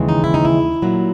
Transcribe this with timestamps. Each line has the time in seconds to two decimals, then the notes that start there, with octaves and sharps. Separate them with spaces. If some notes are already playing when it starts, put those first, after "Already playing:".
Already playing: D#2 C#3 E3 G#3
0.09 D#4
0.24 E4
0.34 D#4
0.45 E4
0.82 A#2 F#3